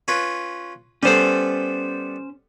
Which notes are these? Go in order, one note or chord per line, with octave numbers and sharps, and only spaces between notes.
C#4 F4 B4
G3 B3 C#4 A4 C5